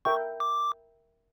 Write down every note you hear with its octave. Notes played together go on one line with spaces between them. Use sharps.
A#4 E5 G5 C#6
D6